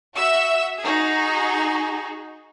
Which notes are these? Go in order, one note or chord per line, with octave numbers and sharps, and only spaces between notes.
F#4 E5 E6
D#4 F#4 G#4